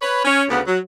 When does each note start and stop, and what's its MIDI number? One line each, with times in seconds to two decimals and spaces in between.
0.01 0.21 71
0.01 0.21 73
0.25 0.43 61
0.49 0.61 38
0.49 0.61 49
0.49 0.61 59
0.66 0.78 54